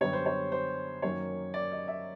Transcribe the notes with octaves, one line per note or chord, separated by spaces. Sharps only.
F#2 D3 G3 B3 C#5
C5
C#5
C5
F#2 D#3 F#3 A#3 C#4 C#5
D5
D#5
E5